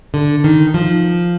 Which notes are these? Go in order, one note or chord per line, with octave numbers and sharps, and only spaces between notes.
D3
D#3
F3